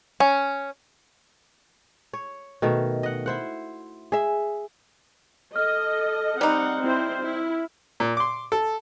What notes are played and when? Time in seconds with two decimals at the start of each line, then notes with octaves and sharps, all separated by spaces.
0.20 C#4
2.13 C#5
2.62 B2 D#3 A3
3.03 D#5 F#5
3.26 E4 C5 F#5
4.12 G#4 E5
5.56 A4 D#5 F6
6.41 G3 C4 D#4 F#5
6.82 C4 E4 C5
7.23 E4
8.00 A#2
8.17 C6 D6
8.52 A4